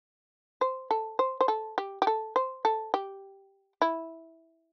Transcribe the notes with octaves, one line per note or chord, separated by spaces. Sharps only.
C5
A4
C5
C5
A4
G4
G4
A4
C5
A4
G4
E4